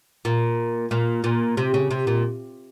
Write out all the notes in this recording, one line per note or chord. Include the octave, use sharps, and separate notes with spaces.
A#2
A#2
A#2
C3
C#3
C3
A#2